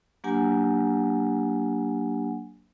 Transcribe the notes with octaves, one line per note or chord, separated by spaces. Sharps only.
F#3 A#3 D4 G4 F#5 G#5